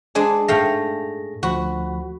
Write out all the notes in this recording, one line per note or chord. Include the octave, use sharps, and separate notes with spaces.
G#3 D4 G#4
G#2 A3 G#4 F5 G5 A#6
D2 F3 F#4 B5